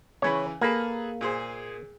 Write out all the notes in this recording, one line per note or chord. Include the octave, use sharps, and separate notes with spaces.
C#3 E3 B4 C#5
A#3 G#4 A4 B4
A#2 G#4 C5